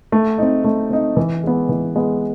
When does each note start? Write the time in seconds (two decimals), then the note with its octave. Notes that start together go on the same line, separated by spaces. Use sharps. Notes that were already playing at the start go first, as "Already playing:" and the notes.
0.12 A3
0.38 C4 D#4
0.64 A3
0.90 C4 D#4
1.17 E3
1.44 G#3 B3
1.69 E3
1.96 G#3 B3